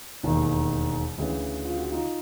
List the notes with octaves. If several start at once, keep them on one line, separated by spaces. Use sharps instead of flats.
E1 D#2 D#3
D2 C#3 E3
F4
F#4
D#4 F4